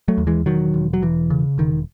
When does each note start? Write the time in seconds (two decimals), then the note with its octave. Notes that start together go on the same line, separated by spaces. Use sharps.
0.08 F#3 A3
0.18 D#2
0.27 E3 G#3
0.46 E1 D#3 F#3
0.74 E1
0.93 F#3
1.02 E1 E3
1.30 C#3
1.58 E1 D#3